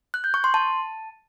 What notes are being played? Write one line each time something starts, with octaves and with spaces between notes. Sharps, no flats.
F#6
G6
C#6
C6
A5